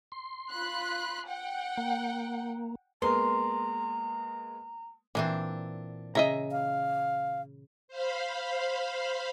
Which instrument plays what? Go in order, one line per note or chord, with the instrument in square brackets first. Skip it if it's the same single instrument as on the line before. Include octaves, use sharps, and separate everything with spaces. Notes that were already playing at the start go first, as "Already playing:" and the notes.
[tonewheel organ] C6
[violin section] F4 B5 F#6
F#5 G5
[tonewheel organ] A#3
[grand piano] G#3 A#3 B3 [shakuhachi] A#5 [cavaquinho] C6
[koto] A#2 E3 C4 [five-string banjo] D4
[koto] C#3 [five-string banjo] D#5 E5 A#5
[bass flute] F5
[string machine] C5 F5 B5